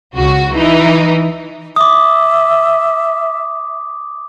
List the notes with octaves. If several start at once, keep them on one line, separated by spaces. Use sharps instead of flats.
C#2 C#3 F#4
E3 D#4
E5 D6 D#6